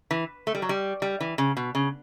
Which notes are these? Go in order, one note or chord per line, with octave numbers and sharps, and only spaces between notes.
E3
A3
G3
F#3
G3
G3
E3
C#3
B2
C#3